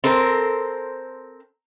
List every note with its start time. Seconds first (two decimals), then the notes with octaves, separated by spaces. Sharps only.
0.04 C4 A4 A#4 C5